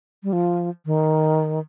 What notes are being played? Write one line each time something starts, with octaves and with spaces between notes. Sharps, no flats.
G3
F3
D#3